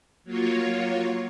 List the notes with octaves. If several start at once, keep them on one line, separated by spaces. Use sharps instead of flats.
F#3 A#3 F4 C#5